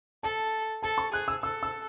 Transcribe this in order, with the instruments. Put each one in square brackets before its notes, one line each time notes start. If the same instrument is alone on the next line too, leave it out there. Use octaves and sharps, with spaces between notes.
[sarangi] A4 [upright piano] A5
[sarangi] A4 [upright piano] A5
[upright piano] C#6
[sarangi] G#4 [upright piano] F#6
[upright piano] E6
[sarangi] A4 [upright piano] E6
[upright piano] E6